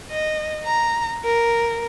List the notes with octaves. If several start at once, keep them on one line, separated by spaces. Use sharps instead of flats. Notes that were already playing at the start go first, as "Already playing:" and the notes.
D#5
A#5
A#4